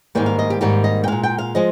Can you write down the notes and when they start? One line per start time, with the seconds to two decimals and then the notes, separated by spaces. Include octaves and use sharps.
0.15 G#2 D#3 G3 A#3 G5
0.26 F5
0.39 D#5
0.50 G4
0.61 G#2 D#3 G3 A#3 G4
0.84 D#5
1.04 G5
1.08 A#2 G#3 F5
1.24 G5
1.38 F5
1.55 F3 G#3 D#5